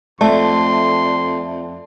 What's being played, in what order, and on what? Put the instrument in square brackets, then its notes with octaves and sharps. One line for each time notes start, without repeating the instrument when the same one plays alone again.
[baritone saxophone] F2 [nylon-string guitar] A3 [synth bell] D5 E5 A5 [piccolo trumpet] C6